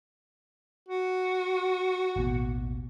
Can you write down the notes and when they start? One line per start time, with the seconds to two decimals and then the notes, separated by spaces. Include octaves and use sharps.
0.88 F#4
2.16 A1 D#2 B2